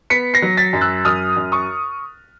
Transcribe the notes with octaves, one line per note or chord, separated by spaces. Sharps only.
B3 B6 C#7
A#6 C7
F#3
A6 B6
F#2
E6 F#6
F#2 D#6 F6
F#2
C#6 D#6